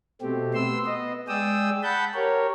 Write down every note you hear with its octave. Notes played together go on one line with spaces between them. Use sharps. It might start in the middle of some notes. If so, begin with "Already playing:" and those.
B2 A3 C4 G4
B3 C6 E6
B3 D#5
G#3 G#4 D5 G5 D#6 E6
F#5 A5 B5 G6
G4 A#4 C#5